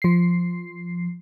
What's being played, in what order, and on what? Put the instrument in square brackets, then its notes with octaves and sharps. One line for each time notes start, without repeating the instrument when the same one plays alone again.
[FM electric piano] F3 C7